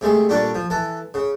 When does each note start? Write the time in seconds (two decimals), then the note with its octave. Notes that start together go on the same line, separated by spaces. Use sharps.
0.01 C3 G#3 A3 G#4
0.29 A#2 G3 D4 A4 C#6
0.55 F3
0.70 E3 A4
1.14 C#3